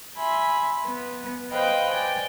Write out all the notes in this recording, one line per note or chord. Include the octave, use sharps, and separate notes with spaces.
E5 G#5 B5 C6
B3
B4 C5 D#5 F5 G5 F#6
D5 G5 G#5